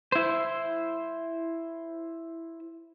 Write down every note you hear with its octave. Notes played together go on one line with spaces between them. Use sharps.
E4 C5